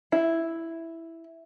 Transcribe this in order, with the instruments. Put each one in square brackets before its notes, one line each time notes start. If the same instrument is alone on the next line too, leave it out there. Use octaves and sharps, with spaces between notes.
[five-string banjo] E4